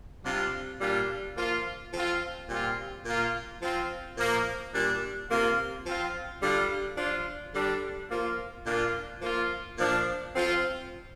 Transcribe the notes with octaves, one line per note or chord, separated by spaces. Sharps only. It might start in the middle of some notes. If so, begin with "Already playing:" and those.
C3 G3 D4 F4
A#2 G3 D4 F4
F3 A#3 F4
F3 C4 F4
A#2 G3 C4 F4
A#2 A#3 F4
F3 C4 F4
A#2 F3 A#3
A#2 G3 D4
C3 A#3 F4
F3 C4 F4
D3 G3 D4 F4
F3 D4 F4
D3 G3 D4
F3 A#3 F4
A#2 A#3 D4 F4
F3 A#3 F4
A#2 F3 D4
F3 C4 F4